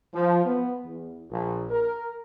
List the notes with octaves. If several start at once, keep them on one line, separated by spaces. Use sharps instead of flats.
F3
B3
E2
A#1
A#4